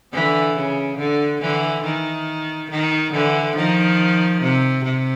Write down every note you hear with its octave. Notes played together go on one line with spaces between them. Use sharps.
D3 E3
C#3
D3
D3 E3
D#3
D#3
D3 E3
D#3 F3
C3
C3